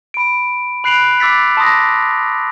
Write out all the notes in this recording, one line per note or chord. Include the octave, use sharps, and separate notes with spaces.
B5 D7
B5 F#6 C7 D7 F7 F#7
D6 E6 A6 B6
A5 C6 D#6 A#6